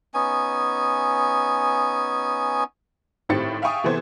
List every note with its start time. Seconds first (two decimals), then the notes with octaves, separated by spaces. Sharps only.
0.14 B3 C#4 D#4 G#5
3.29 G#1 A2 C4 G4 A6 C#7
3.62 E5 F5 G5 G#5 C#6 D#6
3.84 C3 E3 B3 A4 C5 G#6